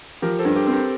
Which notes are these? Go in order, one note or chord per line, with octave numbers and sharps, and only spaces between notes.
F3 G4 A#4
A4 C5
G2
G4 A#4
C4
G4 A#4